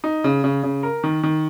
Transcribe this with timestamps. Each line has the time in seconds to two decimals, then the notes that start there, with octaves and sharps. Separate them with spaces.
0.04 D#4
0.24 C#3
0.44 C#3
0.63 C#3
0.83 A#4
1.04 D#3
1.23 D#3